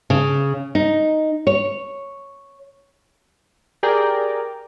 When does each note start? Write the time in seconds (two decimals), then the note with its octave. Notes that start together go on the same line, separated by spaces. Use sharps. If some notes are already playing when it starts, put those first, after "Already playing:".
0.10 C#3
0.75 D#4
1.47 C#5
3.83 G4 G#4 A#4 D5 G5 A#5